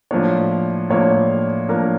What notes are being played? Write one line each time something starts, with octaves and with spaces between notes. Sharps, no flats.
A2 F3 A#3 D4 C#5
A2 F3 A#3 D4 C#5
A2 F3 A#3 D4 A#4